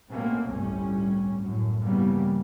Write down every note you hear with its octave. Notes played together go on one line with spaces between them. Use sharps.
B2 A3 A#3 C4 C#4
G1 C2 A2 G3 C#4
F#2 A2
G2 C#3 E3 G3 A#3 B3